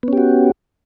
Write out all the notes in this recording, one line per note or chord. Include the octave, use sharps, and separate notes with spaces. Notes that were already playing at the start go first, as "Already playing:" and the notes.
B3 C#4 F#4 G4